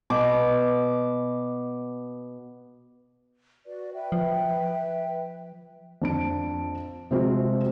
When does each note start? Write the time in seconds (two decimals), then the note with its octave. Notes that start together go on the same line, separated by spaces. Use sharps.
0.10 B2 D6
3.66 F#4 B4 D5
3.94 B4 E5 G5
4.12 F3
6.02 F2 D4 D7
7.11 C3 F3 G#3 C4 F4 F#4